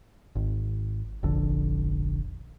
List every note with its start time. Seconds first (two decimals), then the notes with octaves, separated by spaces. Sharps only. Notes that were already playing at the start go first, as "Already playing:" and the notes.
0.35 G#1
1.23 F1 A#1 D3